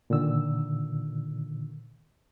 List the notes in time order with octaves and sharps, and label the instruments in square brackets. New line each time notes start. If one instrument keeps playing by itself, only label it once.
[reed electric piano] A#2 D3 D#3 E6